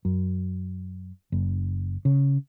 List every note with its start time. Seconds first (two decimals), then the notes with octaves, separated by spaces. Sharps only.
0.05 F#2
1.32 F#1
2.05 C#3